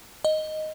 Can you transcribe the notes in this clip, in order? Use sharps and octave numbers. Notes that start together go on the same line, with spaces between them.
D#5